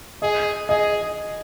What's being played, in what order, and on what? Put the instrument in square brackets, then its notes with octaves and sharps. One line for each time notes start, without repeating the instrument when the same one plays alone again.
[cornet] G#4 [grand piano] D#5
[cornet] G#4 [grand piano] D#5